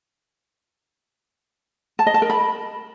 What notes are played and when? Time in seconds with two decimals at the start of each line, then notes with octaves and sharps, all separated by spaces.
1.99 A5
2.07 D#5
2.14 A5
2.22 A#4
2.30 B5